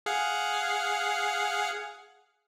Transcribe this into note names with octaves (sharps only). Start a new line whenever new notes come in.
G#4 F5 F#5